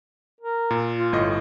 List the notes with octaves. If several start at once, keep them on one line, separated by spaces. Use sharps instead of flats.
A#4
A#2
F4
G1 A2 D#5